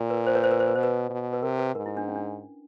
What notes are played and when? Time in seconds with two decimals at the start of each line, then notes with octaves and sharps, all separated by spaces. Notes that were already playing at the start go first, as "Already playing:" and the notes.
Already playing: A#2
0.10 B4
0.27 C5
0.35 B4 C#5
0.44 C5
0.51 B4
0.60 C5
0.68 B4
0.75 B2 C5
0.83 B4
1.10 B2
1.33 B4
1.43 C3 A#4
1.59 B4
1.75 G#2 A#4
1.86 E4
1.97 D4
2.08 C#4
2.16 D4